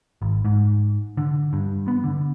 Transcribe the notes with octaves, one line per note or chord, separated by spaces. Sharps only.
G#1
G#2
D3
G2
B3
D3